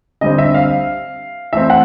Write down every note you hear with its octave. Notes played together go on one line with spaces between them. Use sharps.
D3 G3 C4 D#5
E5
F5
E3 A3 C4 E5
F#5